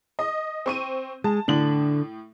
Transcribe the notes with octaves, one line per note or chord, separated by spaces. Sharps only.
D#5
C4 C#6 D#7
G#3 A5
A2 D3 D4 F#7